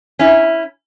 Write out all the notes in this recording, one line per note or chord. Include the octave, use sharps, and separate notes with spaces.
C#4 E4